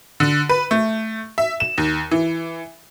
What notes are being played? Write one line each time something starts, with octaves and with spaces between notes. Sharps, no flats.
D3
B4
A3
E5
E7
D#2
E3